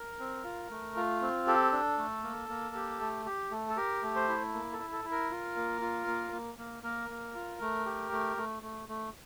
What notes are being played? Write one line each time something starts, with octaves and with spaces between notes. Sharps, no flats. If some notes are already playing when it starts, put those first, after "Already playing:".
Already playing: A#4
C4
F4
A3
F4
C4
G4 A4
D4
A3
A#3
A#3
G4
A3
G4
A3
A4
G4 A#4
A3
C5
E4
A#3
A4
E4
A4
E4
A#4
F4
A#3
F4
A#3
A#3
A#3
A#3 A#4
A#3
F4
A3
G4
A3
A3
A3
A3